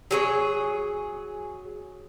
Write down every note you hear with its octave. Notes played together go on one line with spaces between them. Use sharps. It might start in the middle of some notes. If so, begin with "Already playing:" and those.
F#3 G#4 C#5